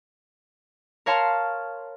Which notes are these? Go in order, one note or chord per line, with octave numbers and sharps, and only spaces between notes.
A#4 C#5 F5 A5 C6